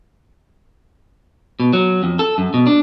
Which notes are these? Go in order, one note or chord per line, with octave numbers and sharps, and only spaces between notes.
B2
F#3
F2
A4
F#2
B2
D4